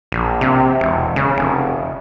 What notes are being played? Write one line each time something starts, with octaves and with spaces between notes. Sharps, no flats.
A#1
C3
E1
C#3
F1